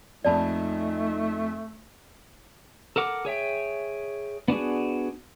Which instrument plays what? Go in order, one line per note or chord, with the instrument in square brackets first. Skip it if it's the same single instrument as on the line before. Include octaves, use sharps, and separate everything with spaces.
[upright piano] A#1 F2 F3 [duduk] A3 [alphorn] D#4 [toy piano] D5 A5 B5
[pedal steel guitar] A4 A#4 F#5 D6
G#4 C#5 E5 G5
B3 D4 F#4 G#4